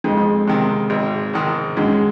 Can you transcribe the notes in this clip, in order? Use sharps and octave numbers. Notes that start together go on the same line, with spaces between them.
F2 G#3
C3 D#3
G#1
G#2 D#3
F#2 G#3